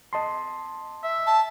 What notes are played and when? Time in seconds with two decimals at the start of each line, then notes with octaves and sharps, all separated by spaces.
0.13 D#5 A5 C6
1.03 E5
1.27 A5